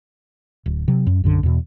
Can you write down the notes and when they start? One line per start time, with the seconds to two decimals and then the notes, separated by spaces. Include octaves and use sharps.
0.66 D1
0.88 C3 F#3
1.07 F#2
1.24 B1 F#2 D3
1.43 E2 B2